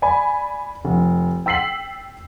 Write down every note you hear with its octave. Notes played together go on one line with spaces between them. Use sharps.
D5 G#5 B5
F1
G5 E6 B6 C7 F#7